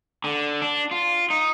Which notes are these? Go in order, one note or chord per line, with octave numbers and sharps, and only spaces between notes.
D3
D4
F4
D#4